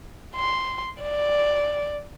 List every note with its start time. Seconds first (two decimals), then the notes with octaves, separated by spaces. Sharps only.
0.36 C6
1.02 D5